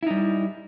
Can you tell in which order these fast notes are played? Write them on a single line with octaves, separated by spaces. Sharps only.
E4 D#4 G3